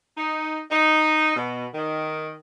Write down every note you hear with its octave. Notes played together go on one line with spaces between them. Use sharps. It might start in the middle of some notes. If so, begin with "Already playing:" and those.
D#4
D#4
B2
D#3